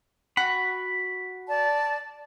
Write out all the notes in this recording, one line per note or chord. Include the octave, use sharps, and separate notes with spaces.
F#4 B5
D5 A5